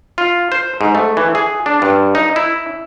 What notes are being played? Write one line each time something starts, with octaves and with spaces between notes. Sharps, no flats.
F4
C5
G#2
A3
E3
G#4
D4
G2
D#4
E4